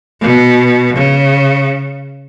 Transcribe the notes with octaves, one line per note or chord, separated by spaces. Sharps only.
B2
C#3